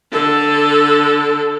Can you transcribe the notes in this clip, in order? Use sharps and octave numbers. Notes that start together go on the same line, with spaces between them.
D3 A4